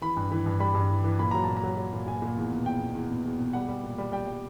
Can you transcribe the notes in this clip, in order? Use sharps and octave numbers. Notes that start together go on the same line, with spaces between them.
E3 B5
G2
E3
G2
G3 B5
G2
E3
E3
A#2 B5
F#3 A#5
A5
A#2
A#5
F#3
F#3
A#2
A#2 G#5
A#2
E2
B2
E2 G5
B2
E2
B2
E2
B2
G3 F#5
G3
A#2
G3
G3 G5
G3